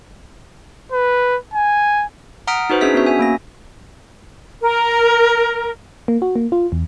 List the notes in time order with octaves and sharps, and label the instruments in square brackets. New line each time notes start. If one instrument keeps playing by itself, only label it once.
[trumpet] B4
G#5
[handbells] F#5 A#5 D#6 F6 B6 D7
D#4 F#4 B4 C5
C#4 D4 G#4 E5 B6
B3 C#4 F#4 E5
E5 G#5
A#3 C#4 A#6
[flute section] A#4
[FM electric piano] A#3
F#4
A#3
F4
E2